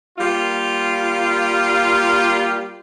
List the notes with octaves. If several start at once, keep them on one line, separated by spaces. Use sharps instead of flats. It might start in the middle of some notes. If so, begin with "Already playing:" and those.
G3 A#3 F4